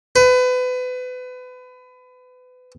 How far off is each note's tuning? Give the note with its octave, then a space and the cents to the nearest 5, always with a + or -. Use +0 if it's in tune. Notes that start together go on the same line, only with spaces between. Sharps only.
B4 +30